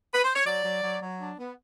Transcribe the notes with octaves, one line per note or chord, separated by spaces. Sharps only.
B4
C5
C#5
F#3 D5
F#3
F#3
F#3
D4
B3